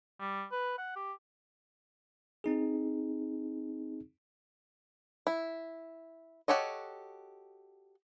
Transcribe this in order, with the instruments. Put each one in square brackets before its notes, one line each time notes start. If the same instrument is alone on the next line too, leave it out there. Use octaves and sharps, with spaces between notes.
[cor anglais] G3
B4
F#5
G4
[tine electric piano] C4 D#4 G#4
[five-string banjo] E4
F#4 G4 A4 C#5 D#5